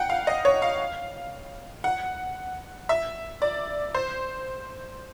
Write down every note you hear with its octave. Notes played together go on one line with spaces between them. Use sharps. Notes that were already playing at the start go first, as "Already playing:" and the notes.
Already playing: F#5 G5
F5
D#5
C#5
F5
F#5
E5
D5
C5